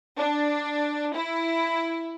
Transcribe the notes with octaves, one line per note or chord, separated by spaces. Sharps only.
D4
E4